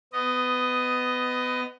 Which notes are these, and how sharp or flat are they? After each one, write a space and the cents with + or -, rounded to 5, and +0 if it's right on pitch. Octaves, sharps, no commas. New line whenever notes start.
B3 +25 D#5 +0